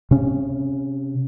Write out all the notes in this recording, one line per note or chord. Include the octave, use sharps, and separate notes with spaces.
C3 C#4